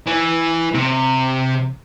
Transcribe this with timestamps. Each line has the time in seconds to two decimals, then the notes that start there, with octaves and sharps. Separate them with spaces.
0.07 E3
0.74 C3